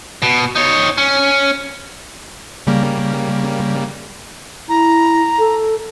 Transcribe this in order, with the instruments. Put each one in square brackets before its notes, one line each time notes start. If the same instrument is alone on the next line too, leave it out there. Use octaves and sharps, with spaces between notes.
[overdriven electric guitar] B2
D#4 C#5
C#4
[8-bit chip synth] C#3 G3 A#3
[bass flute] E4 [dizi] A#5
[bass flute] A4